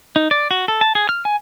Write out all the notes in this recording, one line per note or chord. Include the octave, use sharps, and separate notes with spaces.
D#4
D5
F#4
A4
A5
G#4
F6
G#5